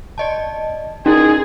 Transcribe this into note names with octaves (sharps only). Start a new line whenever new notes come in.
D5 D#5 A5
C#4 D#4 E4 G#4 A#4